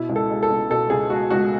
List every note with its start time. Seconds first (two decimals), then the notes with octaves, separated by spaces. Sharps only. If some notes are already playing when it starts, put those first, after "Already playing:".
Already playing: B2 E4
0.09 C#2
0.16 A4
0.30 G#3
0.43 A4
0.50 C#2
0.70 B2 A4
0.90 C#2 G#4
1.10 G#3 F#4
1.30 C#2 F#4